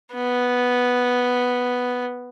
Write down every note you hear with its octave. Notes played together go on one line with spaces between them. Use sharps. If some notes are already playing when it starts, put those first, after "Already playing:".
B3